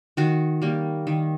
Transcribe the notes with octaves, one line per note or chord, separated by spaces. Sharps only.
D#3 F#4
G3 A#3
D#3